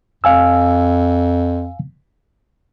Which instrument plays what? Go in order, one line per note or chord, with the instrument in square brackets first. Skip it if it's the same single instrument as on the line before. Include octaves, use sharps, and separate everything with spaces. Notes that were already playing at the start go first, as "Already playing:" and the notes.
[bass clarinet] F2 [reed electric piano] F5 G#5 E6